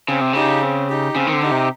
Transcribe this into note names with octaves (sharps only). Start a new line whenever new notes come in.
C#3 C4
C3
C#3 D#4 G4
C4
D#4 G4
C#3 C4
D#3
D3
D#4 G4
C3